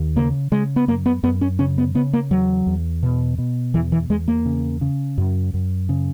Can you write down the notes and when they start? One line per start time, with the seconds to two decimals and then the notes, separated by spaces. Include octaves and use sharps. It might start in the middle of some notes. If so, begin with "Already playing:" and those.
Already playing: D#2
0.16 C#3 A#3
0.52 C#3 G#3
0.76 B3
0.88 F#2 A#3
1.06 B3
1.23 F#2 B3
1.41 C#4
1.59 C#3 C#4
1.78 B3
1.95 C#3 B3
2.13 A#3
2.31 E2 F#3
2.66 E2
3.03 B2
3.38 B2
3.74 E2 E3
3.92 E3
4.10 E2 G#3
4.28 A#3
4.45 C#3
4.81 C#3
5.18 F#2
5.54 F#2
5.89 C#3